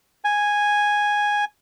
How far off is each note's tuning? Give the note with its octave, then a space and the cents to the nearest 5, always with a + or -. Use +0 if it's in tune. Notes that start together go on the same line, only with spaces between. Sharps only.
G#5 -5